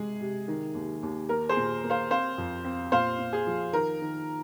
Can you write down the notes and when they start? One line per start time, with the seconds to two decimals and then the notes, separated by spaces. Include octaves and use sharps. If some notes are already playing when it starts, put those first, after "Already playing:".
Already playing: C3 G#3 G#4
0.20 C3
0.48 D#3
0.74 D#2
1.03 D#2
1.29 A#3 A#4
1.49 G#4 C5
1.57 A#2
1.84 A#3
1.90 C5 F5
2.10 C4 C5 F5
2.38 F2
2.65 C4
2.92 A#2 C5 F5
3.19 A#2
3.33 G#4
3.47 F3
3.73 D#3 A#4
4.01 D#3